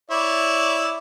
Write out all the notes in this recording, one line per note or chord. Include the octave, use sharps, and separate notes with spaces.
E4 C#5 D5